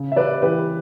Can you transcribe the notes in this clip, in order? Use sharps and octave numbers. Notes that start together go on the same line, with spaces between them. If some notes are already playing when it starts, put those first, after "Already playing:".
Already playing: C#3
E5
G3 B4 D5
E3 G4 B4